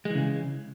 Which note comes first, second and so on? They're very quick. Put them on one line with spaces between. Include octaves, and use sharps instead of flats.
G#3 E3 C#3